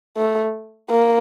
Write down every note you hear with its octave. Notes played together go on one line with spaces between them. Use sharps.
A3
A#3